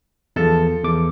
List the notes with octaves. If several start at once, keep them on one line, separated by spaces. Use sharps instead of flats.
E2 F3 A4 A5
E2 D6